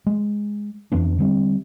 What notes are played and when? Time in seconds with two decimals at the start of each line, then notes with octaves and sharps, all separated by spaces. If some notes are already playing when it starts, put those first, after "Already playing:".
0.06 G#3
0.92 F2 E3 B3 D4
1.19 D3 G3 C4